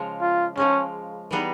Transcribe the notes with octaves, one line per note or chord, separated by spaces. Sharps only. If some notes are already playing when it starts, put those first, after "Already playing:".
Already playing: C#3 F3 G#3
F4
C#3 F3 G#3 C#4
E3 G3 B3 D#4 G#4